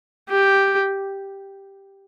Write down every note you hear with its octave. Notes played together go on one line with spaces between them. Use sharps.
G4